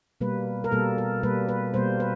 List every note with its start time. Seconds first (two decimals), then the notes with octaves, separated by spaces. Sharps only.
0.21 B2 G3 A#3 B4
0.64 A#4
0.72 B2 G3 A#3 A4
0.98 A#4
1.23 B2 G3 A#3 B4
1.48 B4
1.74 B2 G3 A#3 C5
2.00 B4